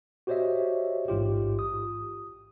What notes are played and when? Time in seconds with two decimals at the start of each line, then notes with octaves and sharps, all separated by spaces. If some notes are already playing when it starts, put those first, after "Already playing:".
0.27 F#4 G4 C5 C#5 D#5 E5
1.08 A1 G#2 F4 G4
1.59 D#6